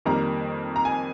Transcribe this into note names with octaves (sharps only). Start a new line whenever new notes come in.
F2 D#3 G3 A#3 A#5
A#5
G#5